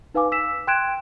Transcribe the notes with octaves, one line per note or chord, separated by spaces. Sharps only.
D#4 B4 F5 G#5 D6
E6 B6 E7
G5 C6 F#6 G#6 D7 E7